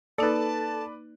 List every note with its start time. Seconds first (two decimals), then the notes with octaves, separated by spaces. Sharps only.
0.18 A#3 D#4 A4 B4 D5 A5